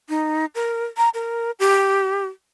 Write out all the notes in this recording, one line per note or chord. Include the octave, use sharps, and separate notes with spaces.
D#4
A#4
A#5
A#4
G4